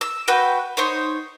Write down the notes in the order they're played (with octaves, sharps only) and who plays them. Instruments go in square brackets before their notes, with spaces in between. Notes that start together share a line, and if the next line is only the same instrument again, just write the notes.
[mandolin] E6
F#4 B4 G5
D#4 C5 C#5